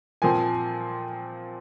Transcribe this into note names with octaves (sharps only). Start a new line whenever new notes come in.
A#2 F3 C4 G#5